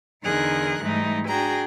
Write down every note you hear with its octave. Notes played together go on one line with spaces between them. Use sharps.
E2 D3 D#4 G#4 A#4 F#6
G#2 E3 G3 A3 D#4
D4 F#4 G#4 G5 A#5